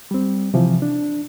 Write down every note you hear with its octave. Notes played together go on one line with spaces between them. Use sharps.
G3 C4
C3 E3 F3
D4